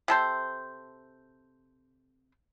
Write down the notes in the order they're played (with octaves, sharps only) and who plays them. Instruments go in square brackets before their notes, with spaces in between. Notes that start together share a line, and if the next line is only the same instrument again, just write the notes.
[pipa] C3 A4 C5